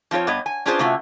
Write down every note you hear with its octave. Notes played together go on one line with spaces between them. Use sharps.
F3 C4 F4 B4 C#5
G2 B3 C#5 D#5
G#5
C#4 D4 F4 G#4 B4 C5
C3 A3 C#4 F4 F#4